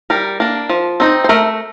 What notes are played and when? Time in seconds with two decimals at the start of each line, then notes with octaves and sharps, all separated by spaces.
0.10 G3 A#4
0.40 A#3 D4
0.69 F3
1.00 C4 D#4
1.24 C5
1.29 A3 A#4